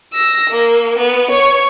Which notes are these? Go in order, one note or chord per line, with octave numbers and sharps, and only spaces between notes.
E6 A#6
A#3
B3
C#5 C#6